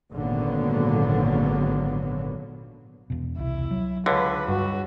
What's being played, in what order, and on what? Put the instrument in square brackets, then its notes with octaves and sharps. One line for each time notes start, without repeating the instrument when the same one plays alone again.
[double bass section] G#1 A#2 D3 F#3 A#3 B3
[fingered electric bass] E2 B2
[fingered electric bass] C2 [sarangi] E4
[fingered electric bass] F#3
[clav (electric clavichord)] C#2 D3 [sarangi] B4
[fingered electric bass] G2 [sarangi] F#4